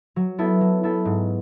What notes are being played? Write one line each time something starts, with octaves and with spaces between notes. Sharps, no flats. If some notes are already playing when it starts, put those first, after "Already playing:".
F#3
B3 E4 A4
F#3
B3 E4 A4
G#2